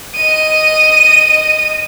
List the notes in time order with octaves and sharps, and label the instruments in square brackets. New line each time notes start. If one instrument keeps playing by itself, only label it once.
[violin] D#5 D#7